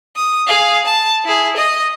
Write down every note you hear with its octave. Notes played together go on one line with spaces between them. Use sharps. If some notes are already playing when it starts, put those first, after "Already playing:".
D#6
G#4 F5
A5
E4 G#4
D#5